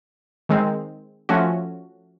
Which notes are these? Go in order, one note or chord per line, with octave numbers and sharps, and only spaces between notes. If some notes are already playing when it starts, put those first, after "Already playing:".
D#3 G#3 C4
F3 A3 C#4 F#4